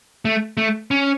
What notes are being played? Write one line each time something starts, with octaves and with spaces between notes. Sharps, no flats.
A3
A3
C#4